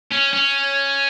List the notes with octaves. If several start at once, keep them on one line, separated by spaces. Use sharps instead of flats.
C#4
C#4